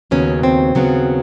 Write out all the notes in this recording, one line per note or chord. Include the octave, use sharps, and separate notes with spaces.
D#2 C#3 F#3 B3 C#4
C4
D#2 C#3 F#3 B3